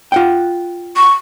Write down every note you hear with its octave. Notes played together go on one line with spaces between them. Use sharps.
F4 F#5 G5
C#6